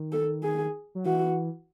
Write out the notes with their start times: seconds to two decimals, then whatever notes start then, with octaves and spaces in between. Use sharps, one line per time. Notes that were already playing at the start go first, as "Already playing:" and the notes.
Already playing: D#3
0.12 A4
0.43 G#4
0.95 F#3
1.06 E3 F#4